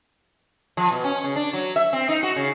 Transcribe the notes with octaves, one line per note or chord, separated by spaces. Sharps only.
F3
B2
C#4
C#3
D4
F#3
E5
C4
D#4
F#4
C#3